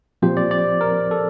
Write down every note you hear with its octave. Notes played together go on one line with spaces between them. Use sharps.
A#2 F3 C4 G4 C5
D5
D5
A#4
A4